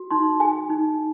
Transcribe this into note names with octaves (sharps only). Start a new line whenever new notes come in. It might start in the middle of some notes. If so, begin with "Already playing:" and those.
Already playing: F#4
D#4 C6
G#4 G#5
D#4